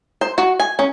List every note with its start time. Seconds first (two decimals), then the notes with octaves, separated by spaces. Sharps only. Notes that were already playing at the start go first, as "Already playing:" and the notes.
0.21 C5
0.38 F#4
0.60 G#5
0.79 C#4